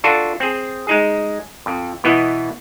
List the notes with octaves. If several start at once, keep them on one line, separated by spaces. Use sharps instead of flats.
D4 F4 F#4 A4
C4 G#4
G#3 D#4 G#4
F2
B2 E3 B3 E4 D#5 F#5